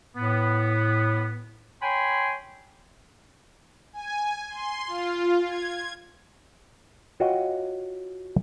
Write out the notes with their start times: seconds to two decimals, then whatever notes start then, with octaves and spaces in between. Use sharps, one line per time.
0.16 A2 B3
1.82 C#5 G5 G#5 B5 C6
3.93 G#5
4.50 C6
4.87 F4
5.44 G#6
7.20 F4 F#4 C#5 D#5 G5